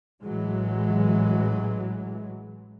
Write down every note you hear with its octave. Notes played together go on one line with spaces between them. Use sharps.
A1 A2 E3 F#3 G#3